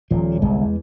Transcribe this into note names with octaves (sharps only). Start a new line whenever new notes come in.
D#1 A#2 F3
G1 C2 G#3
E2